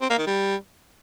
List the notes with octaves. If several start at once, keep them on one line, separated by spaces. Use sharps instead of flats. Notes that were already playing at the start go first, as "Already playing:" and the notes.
C4
A#3
D#3
G3